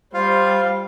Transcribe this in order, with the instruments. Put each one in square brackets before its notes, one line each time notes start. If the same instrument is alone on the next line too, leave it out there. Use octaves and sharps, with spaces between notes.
[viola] G3 [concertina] F4 F5 [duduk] C5